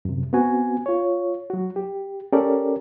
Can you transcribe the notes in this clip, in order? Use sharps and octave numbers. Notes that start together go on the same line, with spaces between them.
F#2 C3
B3 C4 F#4 G#5
F4 C#5
F#3 F#4
G4
C#4 G4 A4 A#4 D5